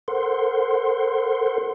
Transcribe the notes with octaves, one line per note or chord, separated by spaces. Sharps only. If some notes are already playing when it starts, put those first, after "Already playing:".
A4 A#4 C5 F#5 C6